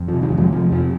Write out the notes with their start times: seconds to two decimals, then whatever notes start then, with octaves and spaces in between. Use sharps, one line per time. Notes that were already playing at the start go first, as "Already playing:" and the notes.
Already playing: F2
0.08 C3 F3
0.22 D#3 F#3
0.32 F2
0.38 F3 G#3
0.52 C3 F3
0.72 F2 F3